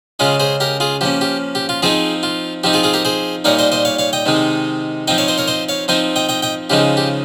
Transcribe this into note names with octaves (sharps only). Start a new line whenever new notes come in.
C#3 G#3 C#4 F4 G#4
G#4 C5
G4 A#4
F4 G#4
F3 A#3 C#4 G4
G4
G4
F4
F3 C4 D#4 F4 G#4
F4
F3 C4 D#4 G4
F4 G#4
F4 G#4
G4 A#4
G#4 C5
A#2 G3 A#3 D#4 A#4 C#5
C5 D#5
C5 D#5
C#5 F5
C#5 F5
D#5 G5
C3 D#3 G#3 D#4
F3 C4 D#4 D#5 G5
C#5 F5
C5 D#5
A#4 C#5
C5 D#5
C#5 F5
F3 C4 D#4 C5 D#5
D#5 G5
D#5 G5
D#5 G5
C#3 F3 G#3 D#4 G4
G4